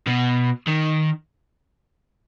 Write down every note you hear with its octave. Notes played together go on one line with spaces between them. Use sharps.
B2
D#3